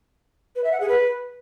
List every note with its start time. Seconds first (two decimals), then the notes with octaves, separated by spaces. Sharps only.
0.56 B4
0.64 E5
0.72 F#5
0.80 G#4
0.89 B4